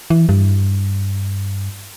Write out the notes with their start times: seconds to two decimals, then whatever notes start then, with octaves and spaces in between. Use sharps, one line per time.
0.10 E3
0.29 G2